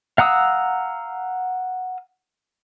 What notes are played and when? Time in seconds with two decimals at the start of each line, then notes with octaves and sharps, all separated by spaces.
0.18 F5 F#5 A#5 D#6 E6